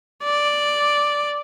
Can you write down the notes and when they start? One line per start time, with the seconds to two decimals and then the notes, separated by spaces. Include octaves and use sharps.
0.23 D5